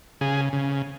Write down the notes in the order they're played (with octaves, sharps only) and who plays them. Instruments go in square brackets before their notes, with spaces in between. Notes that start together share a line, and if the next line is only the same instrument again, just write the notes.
[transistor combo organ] C#3 G#4
C#3